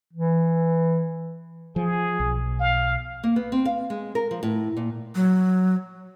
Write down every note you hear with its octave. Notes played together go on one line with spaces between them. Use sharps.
E3
F3 G#4
B1
F5
A#3
B3
C4
F5
G#3
A#4
F3
A2
A#2
F#3